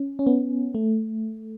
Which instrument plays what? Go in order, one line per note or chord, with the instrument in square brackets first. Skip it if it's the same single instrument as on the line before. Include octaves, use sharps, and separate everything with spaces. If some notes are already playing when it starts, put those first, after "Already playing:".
Already playing: [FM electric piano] C#4
C#4
B3
A3